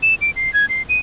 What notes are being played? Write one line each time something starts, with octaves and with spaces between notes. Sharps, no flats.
E7
D7
C7
G#6
C7
D#7